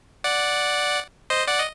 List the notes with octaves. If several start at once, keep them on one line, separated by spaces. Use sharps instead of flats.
D5 F#5
C5 D#5
D5 F#5
D#5